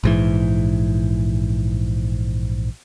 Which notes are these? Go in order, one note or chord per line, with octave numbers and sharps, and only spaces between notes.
A#1 G#2 E3